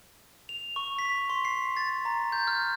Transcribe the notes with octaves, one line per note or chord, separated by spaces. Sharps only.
F7
C#6
B6
C6
C7
A6
A#5
G6
F6